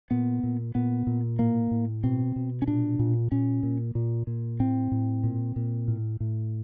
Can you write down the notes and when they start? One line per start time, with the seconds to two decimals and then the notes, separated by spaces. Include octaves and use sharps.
0.11 A#2 B3
0.43 A#2
0.75 A#2 B3
1.07 A#2
1.39 A2 A#3
1.71 A2
2.03 B2 C4
2.36 B2
2.62 C#4
2.68 A#2 D4
2.99 A#2
3.32 A#2 C#4
3.63 A#2
3.95 A#2
4.27 A#2
4.60 A2 C4
4.92 A2
5.23 A#2
5.56 A#2
5.88 A2
6.20 A2